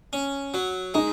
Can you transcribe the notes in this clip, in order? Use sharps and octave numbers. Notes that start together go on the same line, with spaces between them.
C#4
F#3
G#3 D#4